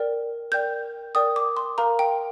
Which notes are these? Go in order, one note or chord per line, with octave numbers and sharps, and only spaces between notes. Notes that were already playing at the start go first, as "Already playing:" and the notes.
Already playing: A#4 D5 G5
A#4 D5 G5 G6
A#4 D5 G5 D#6
D6
C6
A#4 F5 A#5
G5